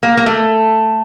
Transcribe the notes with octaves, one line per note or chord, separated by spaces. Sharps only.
A#3
A#3
A3